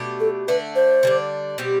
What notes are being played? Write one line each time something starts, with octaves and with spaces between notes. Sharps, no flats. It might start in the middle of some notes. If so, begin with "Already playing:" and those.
Already playing: B2 A3 D4 G4
A4
D3 A3 D4 B4
C5
D3 G3 D4
B2 G3 C4 G4